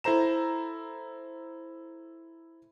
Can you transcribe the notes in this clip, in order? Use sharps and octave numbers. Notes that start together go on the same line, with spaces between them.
E4 A4 C5 A#5 E7